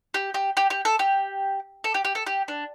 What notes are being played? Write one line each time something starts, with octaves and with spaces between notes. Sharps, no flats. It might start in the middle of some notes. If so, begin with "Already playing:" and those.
G4
G4
G4
G4
A4
G4
A4
G4
G4
A4
G4
D4